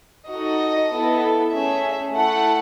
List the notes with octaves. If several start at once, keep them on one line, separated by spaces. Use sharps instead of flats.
D#4 F#4 A4 D#5
B3 E4 A4
A3 C#4 G#4 E5
A3 E4 A4 F#5